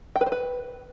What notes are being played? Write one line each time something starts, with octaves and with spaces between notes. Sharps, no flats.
G5
B4
C5
B4